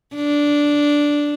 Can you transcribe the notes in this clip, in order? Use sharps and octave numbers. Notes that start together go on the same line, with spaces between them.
D4